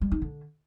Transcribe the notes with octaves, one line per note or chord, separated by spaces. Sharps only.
G3
D#4
D3